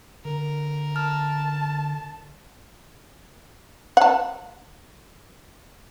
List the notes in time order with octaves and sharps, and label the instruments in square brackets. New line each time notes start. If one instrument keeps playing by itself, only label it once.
[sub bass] D3 [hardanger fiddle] A#4
[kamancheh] A5 [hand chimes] F6
[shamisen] F#5 A5